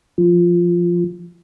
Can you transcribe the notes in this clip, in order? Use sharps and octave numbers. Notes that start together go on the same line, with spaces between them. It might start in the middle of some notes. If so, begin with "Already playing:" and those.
F3